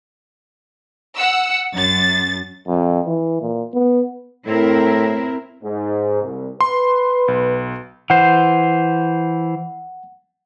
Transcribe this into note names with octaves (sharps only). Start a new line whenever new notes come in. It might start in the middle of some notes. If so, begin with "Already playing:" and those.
F#5 E6
F#2 A6
F2
E3
A#2
B3
A2 C4 E4 A#4
G#2
C2
B4 C6
B1
E3 C5 F#5